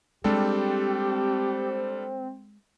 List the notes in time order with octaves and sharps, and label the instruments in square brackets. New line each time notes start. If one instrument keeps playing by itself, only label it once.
[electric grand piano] G3 D4 A4 [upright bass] G#3 [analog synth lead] C4 [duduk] G4